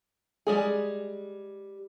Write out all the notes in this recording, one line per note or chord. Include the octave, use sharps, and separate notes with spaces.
G3 G#3 G#4